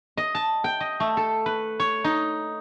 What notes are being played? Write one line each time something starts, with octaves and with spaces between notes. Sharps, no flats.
D#5
A5
G5
D#5
A3
A4
B4
C#5
D#4